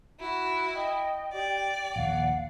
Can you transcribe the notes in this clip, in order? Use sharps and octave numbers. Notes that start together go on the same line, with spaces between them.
E4 F#4
D#5 G5
G4 D5 G5
A#1 D#2 F5 F#5